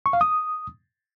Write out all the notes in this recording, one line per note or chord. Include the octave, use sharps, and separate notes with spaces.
C#6
F5
D#6